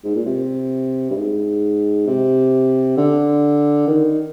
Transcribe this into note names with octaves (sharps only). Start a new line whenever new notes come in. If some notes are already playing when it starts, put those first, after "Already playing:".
G#2
A#2
C3
G2
G#2
C3
D3
D#3